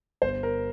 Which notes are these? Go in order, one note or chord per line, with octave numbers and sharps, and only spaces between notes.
G1 C5
A#4